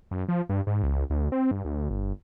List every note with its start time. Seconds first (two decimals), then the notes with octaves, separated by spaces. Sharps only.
0.11 F#2
0.28 F3
0.49 G2
0.67 G#2
0.83 C#2
1.10 D2
1.32 C4
1.51 G2
1.65 D2
1.90 G1